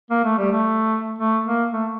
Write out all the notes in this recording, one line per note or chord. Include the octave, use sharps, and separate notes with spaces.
A#3
A3
G3
A3
A3
A#3
A3